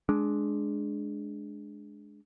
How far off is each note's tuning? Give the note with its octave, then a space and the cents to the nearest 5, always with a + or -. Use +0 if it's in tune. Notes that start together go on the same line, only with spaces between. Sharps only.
G#3 +15 D4 +0